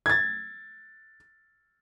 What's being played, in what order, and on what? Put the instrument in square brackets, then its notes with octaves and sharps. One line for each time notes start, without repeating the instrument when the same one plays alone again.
[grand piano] G#6 A6